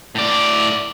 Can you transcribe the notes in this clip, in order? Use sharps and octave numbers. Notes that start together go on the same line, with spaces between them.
A2 D5